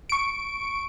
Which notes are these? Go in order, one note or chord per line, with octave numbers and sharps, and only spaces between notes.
C#6 D7